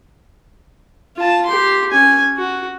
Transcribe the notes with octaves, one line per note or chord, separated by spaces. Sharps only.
F4 A5
G4 C6
C#4 G#5
F#4